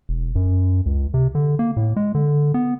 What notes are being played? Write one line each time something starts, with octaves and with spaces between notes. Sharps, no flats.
E1
F#2
C#2
C3
D3
A#3
A2
G#3
D3
B3